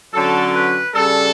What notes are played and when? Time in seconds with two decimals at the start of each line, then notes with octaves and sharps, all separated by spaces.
0.13 D3 F#3 C#4 A4
0.53 B4
0.94 C#3 G3 D4 A4